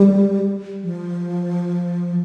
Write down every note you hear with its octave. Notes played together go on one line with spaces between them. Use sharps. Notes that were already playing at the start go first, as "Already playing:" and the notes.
Already playing: G3
F3